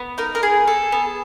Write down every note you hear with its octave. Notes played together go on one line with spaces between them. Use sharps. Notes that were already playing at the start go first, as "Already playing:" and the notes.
Already playing: B3
D#4 A#4
A#4
G#4
A4
B3